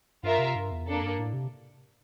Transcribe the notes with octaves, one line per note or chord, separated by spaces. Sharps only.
G2 F4 A#4 E5
C3
G2
E2
F2 A#3 D4 A4
G2
A2
C3